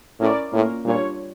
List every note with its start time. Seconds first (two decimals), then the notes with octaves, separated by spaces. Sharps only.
0.20 A2 C#4 E4 A#4 D5
0.52 A2 A#3 C#4 F4 A#4
0.85 A#2 G3 D4 F4 C#5